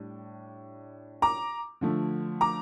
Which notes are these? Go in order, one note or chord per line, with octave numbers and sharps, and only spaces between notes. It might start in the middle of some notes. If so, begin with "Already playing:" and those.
Already playing: A2 G3 D4
A#5 D6
D3 F3 A3
A#5 D6